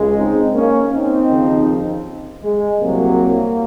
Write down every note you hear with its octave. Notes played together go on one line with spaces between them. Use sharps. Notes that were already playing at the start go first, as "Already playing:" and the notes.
Already playing: C#2 C#3 G#3
C4 D#4
A#3 C#4
C4 D#4
D#2 C#3 F3
G#3
C2 C3 F#3 A#3